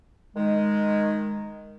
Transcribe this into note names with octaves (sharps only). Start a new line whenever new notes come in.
D#3 G#3